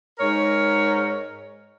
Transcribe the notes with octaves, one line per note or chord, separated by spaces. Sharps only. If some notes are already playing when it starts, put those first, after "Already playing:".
G#2 A#4 C#5